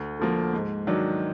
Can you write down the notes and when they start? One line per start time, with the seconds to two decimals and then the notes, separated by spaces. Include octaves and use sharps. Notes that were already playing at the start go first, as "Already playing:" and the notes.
Already playing: D2
0.19 D3 F3 A#3
0.53 G#2
0.87 D#3 F#3 D4